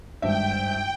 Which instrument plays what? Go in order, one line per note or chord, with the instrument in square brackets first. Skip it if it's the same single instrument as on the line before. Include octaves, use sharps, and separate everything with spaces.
[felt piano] G#1 G2 E5 [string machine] G5